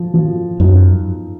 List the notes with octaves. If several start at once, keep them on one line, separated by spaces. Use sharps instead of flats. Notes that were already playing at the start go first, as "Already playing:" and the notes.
Already playing: F3
F3
F#2 D#4